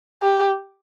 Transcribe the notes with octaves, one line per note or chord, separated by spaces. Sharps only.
G4